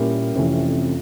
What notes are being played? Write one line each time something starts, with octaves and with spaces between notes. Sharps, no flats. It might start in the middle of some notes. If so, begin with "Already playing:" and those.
Already playing: A#2 G3 A#3 C#4 E4 G4
F2 C3 E3 A3 C#4